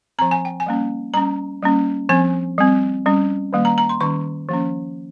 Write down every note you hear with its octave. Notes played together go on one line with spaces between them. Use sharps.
F3 C4 A#5
G#5
G5
G#5
G3 A#3 C#4
G3 C#4 A#5
G3 A#3 C#4
F3 C4 G#5
G3 C4
G3 C#4
D#3 G3 A#3
A#5
A#5
C6
D#3 G3 C#4 C#6
F3 A#3 C#4